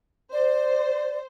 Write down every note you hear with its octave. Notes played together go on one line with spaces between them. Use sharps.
C5 D5